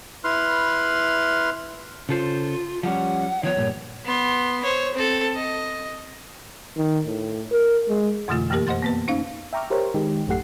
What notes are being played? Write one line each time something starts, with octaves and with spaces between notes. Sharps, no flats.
E4 B4 C6 F6
C#3 F4 A4 C5
F3 G3 C#4 F#5
D#3 F3 B3 C#5
G2 A#2
B3 C6
C5 C#5
C4 A4
D#5
D#3
A2
A#4
G#3
F2 B2 D3 E3 A3 F4
F#2 E3 A#3 G4 A#4
C5 D#5 F#5 C6 A6
A#3 B3 B4
C#4 D#4 C5 F5
E5 G5 A#5 C#6 D6 F6
G4 A#4 C5 C#5
D#3 G#3 D#4 G4
A1 F#2 A3 G4 F#5 C7